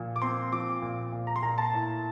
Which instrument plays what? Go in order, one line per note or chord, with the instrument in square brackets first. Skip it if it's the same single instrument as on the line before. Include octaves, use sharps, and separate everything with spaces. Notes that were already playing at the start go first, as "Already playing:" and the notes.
Already playing: [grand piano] A#2 F3
D6
C4 C6
F3 D6
A#2
A#2
A#5
C6
A#2 A#5
A5
A2